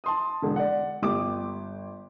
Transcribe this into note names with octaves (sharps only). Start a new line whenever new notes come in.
A5 C6 D#6
E1 D3
D5 F#5
G1 G4 D6